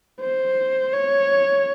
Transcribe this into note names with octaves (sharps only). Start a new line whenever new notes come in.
C5
C#5